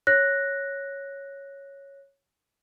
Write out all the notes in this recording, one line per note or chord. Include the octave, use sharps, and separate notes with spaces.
C#5 F#6 A#6